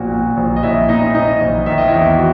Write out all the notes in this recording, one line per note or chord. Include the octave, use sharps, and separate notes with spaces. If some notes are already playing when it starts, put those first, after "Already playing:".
Already playing: A#1 A#2 F#4 F#5
A#2
A#1
D#5
A#1 E4 E5
A#2 D#4 D#5
A#2 D#4 D#5
A#1
D#3 E5
D#5
E2 E4 E5
F#4